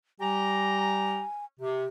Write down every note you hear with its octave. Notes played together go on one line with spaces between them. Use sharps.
G3 G4 G#5 A#5
C3 G4